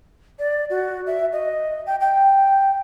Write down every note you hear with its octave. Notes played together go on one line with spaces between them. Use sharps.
D5
F#4
E5
D#5
G5
G5